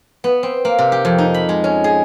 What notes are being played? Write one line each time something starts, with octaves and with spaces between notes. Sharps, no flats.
B3
C4
A#3
C3
G4
F2
D#4
B5
G#3
C#4
G#4